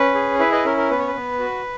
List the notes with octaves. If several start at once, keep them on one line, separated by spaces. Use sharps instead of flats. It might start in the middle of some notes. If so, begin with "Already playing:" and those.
Already playing: C#4 B4
G#4
E4 B4
B4 D#5
C#4 A#4
A#4
B3 B4
C#5
B4
B3
F#4